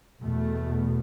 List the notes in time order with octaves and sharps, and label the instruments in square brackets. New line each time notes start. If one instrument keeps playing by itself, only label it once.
[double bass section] E2 B2 A3